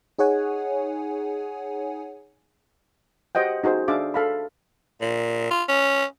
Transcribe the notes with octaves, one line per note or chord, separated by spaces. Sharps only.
D#4 G#4 C#5 F#5 G#5
F#4 G4 C5 D#5 F#5 G5
D#4 F#4 G#4 C5
D4 G#4 E5 F5 D6
A4 F5 B5
A#2
F4
C#4